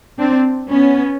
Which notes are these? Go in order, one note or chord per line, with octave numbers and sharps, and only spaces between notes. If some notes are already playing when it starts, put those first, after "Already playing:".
C4 D4
B3 C#4